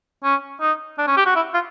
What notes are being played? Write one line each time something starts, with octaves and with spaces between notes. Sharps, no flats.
C#4
D#4
D4
C#4
G4
F#4
E4
F4